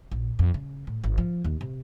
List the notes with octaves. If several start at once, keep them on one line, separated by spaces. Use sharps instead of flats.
A#1
F2
C#3
A2
G#1
F3
D#2
C3